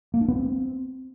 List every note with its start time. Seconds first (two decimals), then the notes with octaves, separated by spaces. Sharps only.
0.14 A#3
0.21 D4
0.28 B3
0.36 C4